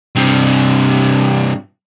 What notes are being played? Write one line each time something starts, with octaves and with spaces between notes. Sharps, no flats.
G2 C3